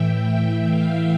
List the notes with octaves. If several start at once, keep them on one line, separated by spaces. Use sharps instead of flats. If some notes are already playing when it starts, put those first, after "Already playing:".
Already playing: A2 E3 E5 G5
F5